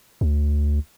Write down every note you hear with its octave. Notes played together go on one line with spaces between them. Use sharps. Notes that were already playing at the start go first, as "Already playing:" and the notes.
D2